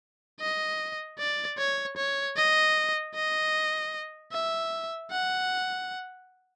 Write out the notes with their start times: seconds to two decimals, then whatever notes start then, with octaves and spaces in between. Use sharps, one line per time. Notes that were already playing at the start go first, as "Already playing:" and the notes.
0.40 D#5
1.19 D5
1.58 C#5
1.97 C#5
2.36 D#5
3.15 D#5
4.32 E5
5.11 F#5